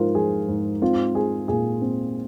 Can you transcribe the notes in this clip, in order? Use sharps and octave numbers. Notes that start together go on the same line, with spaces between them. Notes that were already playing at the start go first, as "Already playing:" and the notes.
Already playing: G#2 F3 F4 A#4 C5
F3 G#4
G#2
C4 F4
G#3 G#4
A#2 G#4
C4